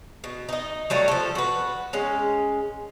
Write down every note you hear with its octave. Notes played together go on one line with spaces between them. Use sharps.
B2
D#4 D#5
F#3 G3 A3 C#5
F3 A4
F#4 B4
G#3 C#4